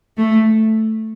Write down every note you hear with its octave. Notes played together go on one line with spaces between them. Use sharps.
A3